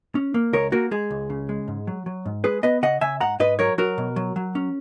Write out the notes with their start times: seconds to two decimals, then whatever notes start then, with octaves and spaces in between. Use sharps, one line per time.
0.15 C#4
0.34 A#3
0.53 C#2 A#4 C#5
0.72 A#3 F#4 A#4
0.91 G#3 G#4
1.10 C#2
1.30 C#3
1.49 G#3
1.68 G#2
1.87 F#3
2.06 F#3
2.26 G#2
2.44 G#3 G#4 B4
2.63 B3 B4 D#5
2.83 C#3 D#5 F#5
3.01 C#3 E5 G#5
3.20 G#2 F#5 A#5
3.40 G#2 B4 D#5
3.59 F#3 A#4 C#5
3.78 F#3 F#4 A#4
3.98 B2
4.16 F#3
4.36 F#3
4.55 C#4